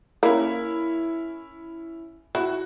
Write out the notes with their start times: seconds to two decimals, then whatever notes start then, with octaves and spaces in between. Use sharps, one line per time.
0.23 A#3 C#4 E4
2.35 E4 F#4